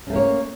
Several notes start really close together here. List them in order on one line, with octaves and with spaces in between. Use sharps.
C#4 A3 A#3 C#5